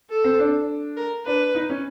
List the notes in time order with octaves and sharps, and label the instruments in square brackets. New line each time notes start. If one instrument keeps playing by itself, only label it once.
[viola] A4
[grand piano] C4
D4
[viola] A#4
[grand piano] D4 [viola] B4
[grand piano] D#4
C#4